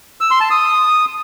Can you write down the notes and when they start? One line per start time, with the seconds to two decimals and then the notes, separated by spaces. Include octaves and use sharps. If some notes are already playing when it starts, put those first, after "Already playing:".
0.21 E6
0.31 C6
0.41 A5
0.51 D#6